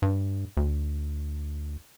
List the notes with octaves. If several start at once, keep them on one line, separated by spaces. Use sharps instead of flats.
G2
D2